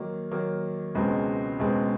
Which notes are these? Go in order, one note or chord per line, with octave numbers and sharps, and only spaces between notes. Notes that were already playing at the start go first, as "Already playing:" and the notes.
Already playing: D#3 F#3 A#3
D#3 F#3 A#3
C#2 B2 G#3 C4
C#2 B2 G#3 C4